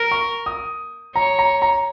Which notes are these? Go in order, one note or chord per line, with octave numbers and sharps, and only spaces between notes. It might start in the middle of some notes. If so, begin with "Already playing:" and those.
Already playing: A#4
C#6
D#6
C#5 A#5
A#5
A#5